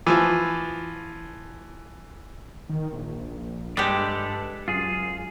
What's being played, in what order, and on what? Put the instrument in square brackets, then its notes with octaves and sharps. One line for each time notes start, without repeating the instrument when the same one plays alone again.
[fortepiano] E3 F3
[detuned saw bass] D#3
A#1
[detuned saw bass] G2 [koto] G#3 G4 [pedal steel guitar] A4 B4 D5
[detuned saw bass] F#2 [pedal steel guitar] F4 G#4